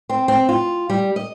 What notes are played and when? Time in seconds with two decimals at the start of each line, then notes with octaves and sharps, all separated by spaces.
0.09 C4
0.28 C4
0.49 F4
0.90 G3
1.16 D#5